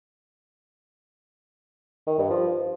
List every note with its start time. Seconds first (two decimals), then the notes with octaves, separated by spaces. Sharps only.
2.07 D#3
2.18 G2
2.30 F3